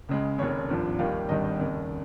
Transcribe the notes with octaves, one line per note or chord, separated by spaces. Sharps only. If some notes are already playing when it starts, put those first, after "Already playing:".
C#2 C#3 G#3
F1 D#2 C#3 C#5
G#1 G2 F3
D#2 D#3 G3 F5
G#1 G2 D#3 G3 D#5
D#5
F1 D#2 C#3